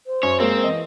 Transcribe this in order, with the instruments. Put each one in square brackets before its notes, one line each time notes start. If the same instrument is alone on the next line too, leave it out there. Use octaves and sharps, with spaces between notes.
[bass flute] C5
[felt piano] F#2 [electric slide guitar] C#5
[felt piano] G#3 A#3 [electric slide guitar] C4
[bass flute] E3 [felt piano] D#5